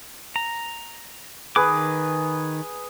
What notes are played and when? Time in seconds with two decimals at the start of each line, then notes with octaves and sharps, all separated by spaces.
0.36 A#5
1.56 D#3 G#4 B4 D6